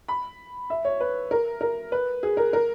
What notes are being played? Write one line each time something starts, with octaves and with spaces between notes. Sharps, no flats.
B5
E5
C#5
B4
A#4
A#4
B4
G#4
A#4
A#4